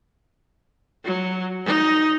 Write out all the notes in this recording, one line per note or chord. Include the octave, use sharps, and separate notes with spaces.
F#3
D#4